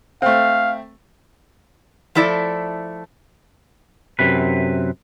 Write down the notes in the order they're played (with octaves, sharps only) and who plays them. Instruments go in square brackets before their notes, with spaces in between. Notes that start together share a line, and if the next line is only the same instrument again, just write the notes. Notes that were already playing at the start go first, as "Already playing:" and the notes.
[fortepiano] A3 C4 [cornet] F5
[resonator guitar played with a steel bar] F3 A3 E4 A4 D5
[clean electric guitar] F#2 C3 B4